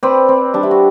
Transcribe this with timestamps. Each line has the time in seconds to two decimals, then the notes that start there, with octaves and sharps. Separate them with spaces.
0.03 C4 B4 D5
0.28 C4
0.54 G3 D4
0.63 E4
0.71 F#4